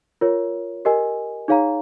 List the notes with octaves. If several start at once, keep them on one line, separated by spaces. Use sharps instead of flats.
F4 A#4 C#5
G4 A#4 D#5 G#5
D#4 G#4 C#5 F5 A#5